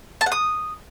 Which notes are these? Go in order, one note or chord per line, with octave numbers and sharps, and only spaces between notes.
A5
F#5
D#6